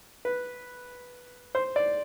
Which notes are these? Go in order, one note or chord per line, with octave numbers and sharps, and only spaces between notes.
B4
C5
D5